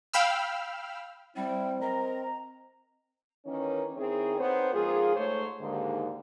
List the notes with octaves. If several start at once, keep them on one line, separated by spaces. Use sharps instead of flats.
F5 G5 B5 E6 F6
G3 C4 E4 G5
A#4 D#5 A#5
D#3 E3 A#3 C#4
D#3 C4 D#4 E4 G#4 C#5
B3 C4 D#4 A4 C5 C#5
F2 G#2 A#3 F4 G#4
G#2 A3 C5 C#5
D#2 G#2 D3